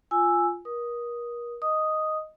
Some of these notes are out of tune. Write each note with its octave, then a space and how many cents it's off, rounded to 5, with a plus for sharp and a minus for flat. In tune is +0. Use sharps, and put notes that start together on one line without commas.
F4 +0 G#5 +0 E6 +0
A#4 +35 D#6 +0
D#5 +0 D#6 +0